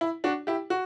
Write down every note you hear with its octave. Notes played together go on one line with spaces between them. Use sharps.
E4
D4 F#4
E4 G4
F#4